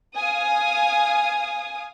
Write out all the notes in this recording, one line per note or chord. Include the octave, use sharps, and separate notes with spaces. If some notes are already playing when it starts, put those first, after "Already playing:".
F5 G#5 D#6